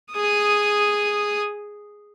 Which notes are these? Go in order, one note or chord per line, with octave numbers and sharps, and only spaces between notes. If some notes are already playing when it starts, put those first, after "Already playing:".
G#4 D#6